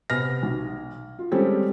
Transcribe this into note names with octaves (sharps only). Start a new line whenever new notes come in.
C3 B3 F6 A#6
B1
F4
G3 G#3 C4 C#4 G4 A4